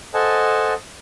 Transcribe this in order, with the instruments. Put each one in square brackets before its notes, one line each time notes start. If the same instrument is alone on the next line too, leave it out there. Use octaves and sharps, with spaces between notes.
[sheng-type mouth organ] A4 C5 D#5 F#5 G#5 A5